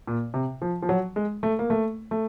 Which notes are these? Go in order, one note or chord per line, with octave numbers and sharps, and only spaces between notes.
A#2
C3
F3
F3
F#3
G#3
A3
A#3
A3
A3